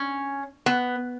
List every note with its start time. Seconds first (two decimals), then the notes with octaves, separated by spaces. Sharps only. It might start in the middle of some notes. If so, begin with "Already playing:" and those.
Already playing: C#4
0.66 B3